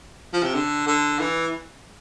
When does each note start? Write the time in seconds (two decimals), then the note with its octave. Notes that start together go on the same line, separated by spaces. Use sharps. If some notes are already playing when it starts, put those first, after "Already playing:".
0.34 F3
0.43 C3
0.54 D3
0.87 D3
1.20 E3